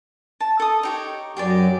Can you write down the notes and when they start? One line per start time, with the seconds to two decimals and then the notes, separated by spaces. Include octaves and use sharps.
0.40 A5
0.60 A4 D#6
0.83 D#4 G4 C#5
1.37 F#2 G4 G#4 D5